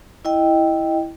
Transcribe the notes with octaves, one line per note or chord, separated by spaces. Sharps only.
E4 D#5 G5